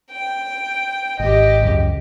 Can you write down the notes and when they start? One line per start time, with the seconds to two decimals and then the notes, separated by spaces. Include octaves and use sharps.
0.11 G5
1.19 G#1 G4 D#5
1.62 C#2 F#2